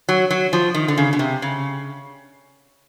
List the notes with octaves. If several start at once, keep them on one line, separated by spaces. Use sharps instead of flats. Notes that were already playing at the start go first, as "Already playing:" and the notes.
F#3
F#3
F3
D#3
D3
C#3
B2
C3
C#3